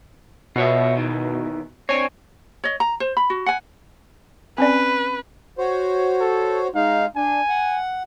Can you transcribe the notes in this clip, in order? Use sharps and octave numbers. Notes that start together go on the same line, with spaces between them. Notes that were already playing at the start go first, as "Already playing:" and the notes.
B2 F4 C#5 E5
E2 D#3 E3
C4 D4 C#5 G#5
C#5 D#5
A#5
C5
B5
F#4
F#5 G#5
C4 C#4 B4 D5
F#4 C5 C#5
A4
G#3 D#4 F5
D4 G#5
F#5